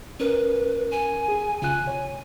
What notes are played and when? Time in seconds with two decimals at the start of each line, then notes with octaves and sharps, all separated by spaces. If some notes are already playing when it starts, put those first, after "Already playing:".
0.20 C#4 A#4 B4
0.91 G#5
1.28 G#4
1.62 C#3 F4 G#5 F#6
1.85 C3 C#5